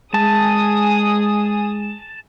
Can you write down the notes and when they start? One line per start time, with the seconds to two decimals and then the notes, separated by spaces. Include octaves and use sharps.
0.14 G#3 G#4 A5 D#6